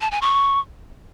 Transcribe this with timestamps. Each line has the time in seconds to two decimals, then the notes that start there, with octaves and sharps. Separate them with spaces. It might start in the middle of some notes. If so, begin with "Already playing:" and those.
0.01 A5
0.11 G#5
0.22 C#6